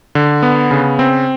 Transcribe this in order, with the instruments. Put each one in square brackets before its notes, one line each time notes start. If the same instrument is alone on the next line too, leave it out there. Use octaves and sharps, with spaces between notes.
[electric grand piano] D3
B3
C#3
C4